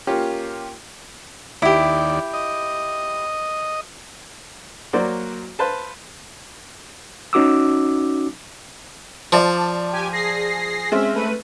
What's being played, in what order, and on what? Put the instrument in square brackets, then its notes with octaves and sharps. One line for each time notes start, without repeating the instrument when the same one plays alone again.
[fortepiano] A#3 C#4 F4 G4
[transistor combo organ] D#2 D5 [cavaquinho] E4 G4
[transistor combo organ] D#5
[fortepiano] F#3 A#3 F#4 C5 D5
B4 C5 F5 A5
[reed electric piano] C#4 D#4 F#4 D6 E6
[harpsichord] F3 [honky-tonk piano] D5 A5
[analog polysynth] G4 G#5
G#4 A#6 C7
[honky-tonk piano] G#3 C4 C#4 [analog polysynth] E5
[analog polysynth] A3 B4 D#7